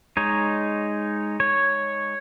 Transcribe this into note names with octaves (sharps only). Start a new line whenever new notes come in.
G#3 D#4 C#5
C#5